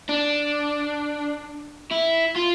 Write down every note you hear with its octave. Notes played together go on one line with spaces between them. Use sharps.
D4
E4
F4